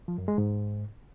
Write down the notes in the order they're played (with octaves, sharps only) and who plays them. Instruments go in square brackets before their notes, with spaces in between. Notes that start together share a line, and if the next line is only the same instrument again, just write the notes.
[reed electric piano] F3
F#2
G#3
G#2